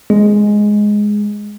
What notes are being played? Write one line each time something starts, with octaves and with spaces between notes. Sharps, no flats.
G#3